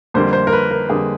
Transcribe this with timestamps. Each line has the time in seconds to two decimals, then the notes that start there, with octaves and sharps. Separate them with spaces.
0.14 F2 D3 G3 A#3 C5
0.33 C5
0.47 A#4
0.53 B4
0.71 A#4
0.89 F2 D3 G3 A#3 G#4